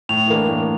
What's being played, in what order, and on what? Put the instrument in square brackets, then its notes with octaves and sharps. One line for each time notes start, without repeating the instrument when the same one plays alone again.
[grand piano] A2 [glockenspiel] F7
[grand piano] E3 A#3 D4
A2